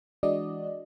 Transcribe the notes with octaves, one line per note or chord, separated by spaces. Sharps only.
E3 G#3 D4 F#4 D5 D#5